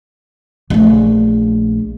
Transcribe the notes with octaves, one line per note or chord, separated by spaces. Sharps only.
A#1 A3